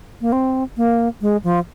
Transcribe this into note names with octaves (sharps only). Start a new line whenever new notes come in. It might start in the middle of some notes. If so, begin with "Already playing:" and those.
A#3
C4
A#3
G#3
F3